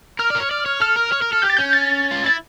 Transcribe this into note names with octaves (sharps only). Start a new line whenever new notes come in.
A#4 F6
D5
A#4
C#5
D5
C#5
A4 F6
A#4
C#5
A#4
A4
G4 G6
A6
C#4 G6
A6
F4
E4 A6